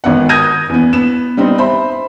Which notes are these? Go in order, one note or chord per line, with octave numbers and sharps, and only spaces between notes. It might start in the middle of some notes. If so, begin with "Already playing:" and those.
G#1 B3 F#5
D#6 G6 G#6 A#6 D#7
E2 B3
B3 E7
G3 B3 C4 D#4
C5 E5 B5